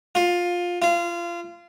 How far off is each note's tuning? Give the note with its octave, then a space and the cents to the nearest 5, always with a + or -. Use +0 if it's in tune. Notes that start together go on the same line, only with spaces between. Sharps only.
F4 +15
F4 -25